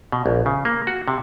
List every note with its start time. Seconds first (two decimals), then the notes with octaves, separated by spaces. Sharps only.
0.12 B2
0.26 A#1
0.46 C#3
0.65 A#3
0.87 F#4
1.08 C3